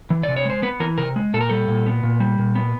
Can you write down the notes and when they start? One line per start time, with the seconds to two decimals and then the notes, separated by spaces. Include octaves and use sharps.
0.10 E3
0.23 C3 D5
0.36 C#5
0.45 G#3 C5
0.62 B3 B4
0.80 E3 A#4
0.98 C3 A#4
1.16 G#3
1.33 A#2 A4
1.41 A#4
1.49 G3 A4
1.68 A#2
1.86 B3
2.03 A#2
2.20 G3
2.38 A#2
2.55 B3